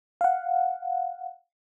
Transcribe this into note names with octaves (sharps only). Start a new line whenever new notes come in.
F5 F#5